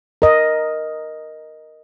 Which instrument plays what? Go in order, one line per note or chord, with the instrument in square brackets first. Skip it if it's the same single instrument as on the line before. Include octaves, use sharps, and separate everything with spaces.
[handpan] A#4 D#5